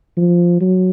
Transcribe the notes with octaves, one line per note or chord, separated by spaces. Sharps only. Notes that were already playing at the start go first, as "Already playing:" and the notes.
F3
F#3